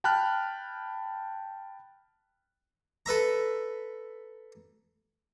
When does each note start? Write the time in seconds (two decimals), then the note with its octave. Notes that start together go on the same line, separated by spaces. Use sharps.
0.04 G5 A5 B5 F6 F#6
3.06 A4 B4 E5 A#5